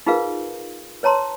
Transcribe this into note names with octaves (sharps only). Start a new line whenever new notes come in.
D#4 F4 G#4 A#4 B4 F5
B4 C#5 A5 A#5 C6